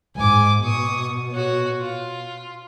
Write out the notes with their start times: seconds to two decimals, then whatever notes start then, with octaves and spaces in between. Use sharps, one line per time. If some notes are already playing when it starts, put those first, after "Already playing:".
0.16 G#2 G#5 D6
0.64 B2 C#6 D#6
1.31 F#4 C#5
1.81 F4